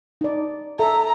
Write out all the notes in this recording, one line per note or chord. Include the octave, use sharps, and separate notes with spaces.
D#4 D5
A4 E5 A#5